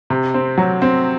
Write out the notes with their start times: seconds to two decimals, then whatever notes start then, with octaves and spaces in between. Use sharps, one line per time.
0.10 C3
0.34 C4
0.58 F#3
0.82 C4